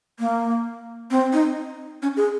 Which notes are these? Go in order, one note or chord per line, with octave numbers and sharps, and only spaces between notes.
A#3
C4
D#4
C#4
G#4